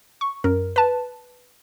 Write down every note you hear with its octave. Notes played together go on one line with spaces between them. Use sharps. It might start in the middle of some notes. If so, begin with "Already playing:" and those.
C#6
F#2 A#4
B4 A5